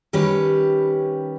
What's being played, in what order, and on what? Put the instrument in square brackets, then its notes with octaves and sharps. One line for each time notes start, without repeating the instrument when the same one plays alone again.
[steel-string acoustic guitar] D#3 G3 C#4 G4 B4 C#5